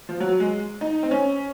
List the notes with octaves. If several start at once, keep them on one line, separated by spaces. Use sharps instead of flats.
F3
F#3
G#3
D#4
C4
C#4